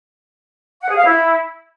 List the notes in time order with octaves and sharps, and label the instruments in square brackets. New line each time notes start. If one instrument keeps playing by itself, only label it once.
[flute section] F#5
G#4
F5
E4